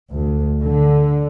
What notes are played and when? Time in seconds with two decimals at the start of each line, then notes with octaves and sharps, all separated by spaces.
0.11 D2
0.62 D3